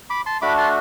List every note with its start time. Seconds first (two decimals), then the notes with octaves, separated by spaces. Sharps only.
0.10 B5 D6
0.26 A5 C6
0.42 A3 D4 F#4 B5 D6
0.58 A5 C6